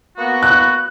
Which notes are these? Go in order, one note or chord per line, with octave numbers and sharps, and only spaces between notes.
A#3 B3 F#4
F#6